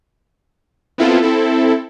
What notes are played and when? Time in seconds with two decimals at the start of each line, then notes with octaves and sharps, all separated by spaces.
0.98 B3 C4 E4 F4 A4
1.22 C4 E4 A4